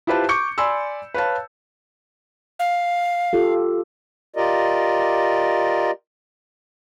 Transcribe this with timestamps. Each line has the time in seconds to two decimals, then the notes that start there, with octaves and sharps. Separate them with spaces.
0.07 E4 F4 G4 B4 C5 A5
0.29 C#6 D6 G6 C#7
0.58 D5 G#5 B5 C6 E6
1.14 B4 C#5 F5 A5
2.59 F5
3.33 F4 G4 A4
4.36 F4 G4 A#4 D5 D#5